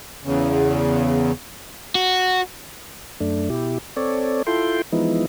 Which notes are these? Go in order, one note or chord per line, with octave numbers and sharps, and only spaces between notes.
E2 C#3
F#4
F#2 A3 D4
B2 E4 G4
C4 A4 C#5 D5
E4 F4 A4 G5 C6
E3 F3 G#3 B3 D#4 E4